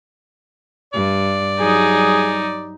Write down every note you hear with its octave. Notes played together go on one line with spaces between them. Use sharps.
G2 D5
F#3 G3 D#4 G#4